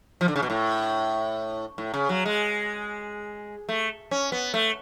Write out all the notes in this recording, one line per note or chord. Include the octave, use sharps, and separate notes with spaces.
F3
D3
C#3
B2
A2
A2
C#3
F#3
G#3
A3
C#4
B3
A3